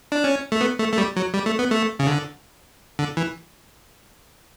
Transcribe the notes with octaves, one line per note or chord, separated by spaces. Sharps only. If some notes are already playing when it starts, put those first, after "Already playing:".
D4
C#4
A3
B3
A3
A3
G3
F#3
G3
A3
B3
A3
C#3
D3
D3
E3